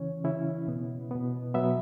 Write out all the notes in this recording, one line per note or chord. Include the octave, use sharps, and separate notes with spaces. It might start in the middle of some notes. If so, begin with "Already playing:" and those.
Already playing: C#3 E3 C#4 C#5
C#3 E3 C#4 E4
B2 B3
B2 B3
B2 F#3 B3 E5